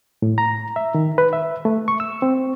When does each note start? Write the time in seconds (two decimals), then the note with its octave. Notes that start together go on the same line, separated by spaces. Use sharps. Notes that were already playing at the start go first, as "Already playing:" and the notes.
0.22 A2
0.38 A#5
0.76 E5
0.95 D#3
1.18 B4
1.33 E5
1.65 A3
1.88 C#6
2.00 E6
2.22 C4